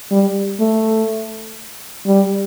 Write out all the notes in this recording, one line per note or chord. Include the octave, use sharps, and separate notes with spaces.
G3
A3
G3